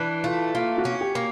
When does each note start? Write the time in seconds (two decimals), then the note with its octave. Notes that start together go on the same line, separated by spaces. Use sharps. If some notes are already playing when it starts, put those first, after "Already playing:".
Already playing: E3 D4
0.24 A3 F4
0.55 A#3 F4
0.78 F#4
0.85 C#4
1.01 G4
1.15 A#3